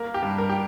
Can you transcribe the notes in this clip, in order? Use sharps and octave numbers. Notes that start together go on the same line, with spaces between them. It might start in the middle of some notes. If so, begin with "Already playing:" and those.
Already playing: A#3 A#4
G4
G2
A#4
G4